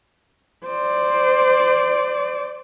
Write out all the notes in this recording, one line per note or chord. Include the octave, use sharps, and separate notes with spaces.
C5 D5